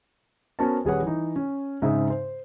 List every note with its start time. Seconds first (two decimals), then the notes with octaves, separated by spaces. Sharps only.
0.59 B3 C#4 F#4 A#4 C5 A5
0.85 D#1 G3 G#4 B4 C#5 F#5
1.03 E3 D#4
1.36 C#4
1.82 G#2 C#3 C4 D#4 G#4 E5
2.10 C5